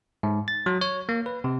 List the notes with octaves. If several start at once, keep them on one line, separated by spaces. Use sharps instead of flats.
G#2
A6
F#3
C#5
A#3
B4
C3